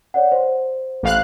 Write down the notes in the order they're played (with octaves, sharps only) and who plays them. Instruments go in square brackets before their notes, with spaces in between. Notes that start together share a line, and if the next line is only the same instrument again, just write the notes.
[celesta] C#5 D5 F#5
C5
[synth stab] A1 F5 F#6